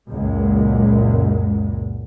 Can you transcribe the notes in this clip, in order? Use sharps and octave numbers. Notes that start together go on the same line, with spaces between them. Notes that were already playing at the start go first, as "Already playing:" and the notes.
C#2 F#2 A#2 G#3